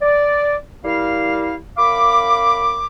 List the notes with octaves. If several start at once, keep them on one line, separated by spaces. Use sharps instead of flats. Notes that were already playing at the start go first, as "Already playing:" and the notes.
D5
G3 E4 A#4 F5
F#2 F5 B5 D6